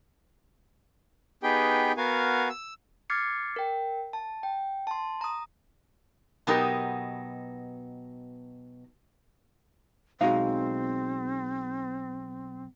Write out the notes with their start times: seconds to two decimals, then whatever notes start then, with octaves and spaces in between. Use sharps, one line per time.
1.43 B3 D#4 G4 G#4 B4 G5
1.97 B3 F#4 A#4 F5 G#5
2.50 E6
3.10 D6 F6 G#6 A6 C7 C#7
3.56 A#4 G5
4.13 A5
4.43 G5
4.87 A5 C6
5.21 A#5 D#6
6.47 B2 F#3 B3 D#4 G4 A#4
10.21 B1 G#3 C4 D#4 F#4 F5